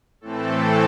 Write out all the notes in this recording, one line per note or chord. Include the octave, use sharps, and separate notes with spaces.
A2 E3 A3 C4 A4